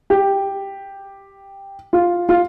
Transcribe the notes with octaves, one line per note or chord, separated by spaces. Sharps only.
G4
F4
F4